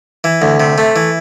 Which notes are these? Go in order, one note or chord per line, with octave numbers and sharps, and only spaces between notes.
E3
D2
C3
A3
E3